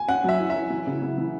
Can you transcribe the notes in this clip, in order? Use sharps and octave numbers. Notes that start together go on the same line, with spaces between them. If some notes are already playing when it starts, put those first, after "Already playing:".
Already playing: G#5
C#4 F#5
F#3 E5
E4
E5
E4
E3
C#3
C#3
E3